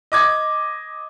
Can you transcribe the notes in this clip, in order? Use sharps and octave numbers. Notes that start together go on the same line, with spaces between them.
D#5 D6 G#6